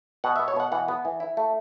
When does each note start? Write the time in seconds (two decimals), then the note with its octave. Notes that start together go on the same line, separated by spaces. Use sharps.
0.24 B2 F#5
0.36 B3 E5
0.48 C#5
0.57 B2 F#5
0.72 E3 F#5
0.88 B3
1.05 E3
1.20 E4
1.37 A3